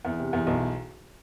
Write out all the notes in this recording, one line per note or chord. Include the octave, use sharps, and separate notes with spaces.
E2
C3
E2
B1